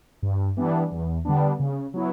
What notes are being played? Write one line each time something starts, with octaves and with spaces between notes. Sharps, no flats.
G2
E3 G3 B3 D4
E2
D3 G3 B3 D4
C#3
F#3 B3 E4